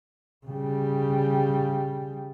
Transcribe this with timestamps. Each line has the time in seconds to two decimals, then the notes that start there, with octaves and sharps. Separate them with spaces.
0.46 C#3 G3